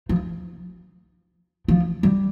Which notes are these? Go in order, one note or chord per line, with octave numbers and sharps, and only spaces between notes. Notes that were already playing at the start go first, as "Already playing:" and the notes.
F3
F3
G3